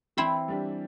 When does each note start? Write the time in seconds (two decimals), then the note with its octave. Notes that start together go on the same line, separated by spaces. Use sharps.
0.17 E3 C4 E4
0.48 G3 D4 G4